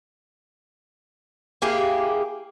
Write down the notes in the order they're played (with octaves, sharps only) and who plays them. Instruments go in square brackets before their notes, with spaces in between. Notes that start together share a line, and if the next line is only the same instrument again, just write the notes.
[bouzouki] A#3 E4 G4 G#4